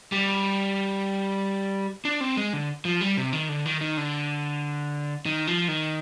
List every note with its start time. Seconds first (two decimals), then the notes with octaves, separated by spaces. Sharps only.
0.12 G3
2.05 D4
2.21 C4
2.37 G#3
2.53 D3
2.85 F3
3.01 G3
3.17 C3
3.33 D#3
3.49 D3
3.66 D#3
3.81 D#3
3.97 D3
5.26 D#3
5.47 F3
5.68 D#3